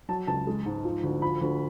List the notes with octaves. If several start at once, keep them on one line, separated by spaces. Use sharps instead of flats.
F#3 A5
C#2 A5
G#3
G#2
F3
D2
F3 B5
D2